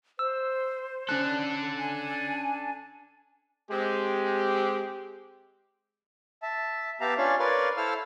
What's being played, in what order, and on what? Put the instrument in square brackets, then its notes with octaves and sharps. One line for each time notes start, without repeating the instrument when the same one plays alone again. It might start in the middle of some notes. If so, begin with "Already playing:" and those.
[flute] C5 [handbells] E6
[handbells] C#4 F#6 [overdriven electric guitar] D4 A4
[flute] G#5
[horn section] G#3 C4 G4
[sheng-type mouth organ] E5 A5
B3 G4 E5 F5 A5 A#5
C#4 D4 F4 C#5 D5 F5
A#4 B4 C#5 D5 F5 C6
E4 A4 C5 F5 E6 F6